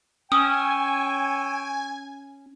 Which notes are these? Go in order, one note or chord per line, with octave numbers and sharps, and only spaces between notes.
C#4 G5 G#5 C#6 D#6 E6